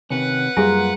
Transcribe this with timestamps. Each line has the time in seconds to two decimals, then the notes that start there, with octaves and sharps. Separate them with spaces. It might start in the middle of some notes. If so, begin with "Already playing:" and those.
0.11 C3 D#3 C#4 B4 F#5 F#6
0.57 F#2 G3 A#3 F4 G#4 A#5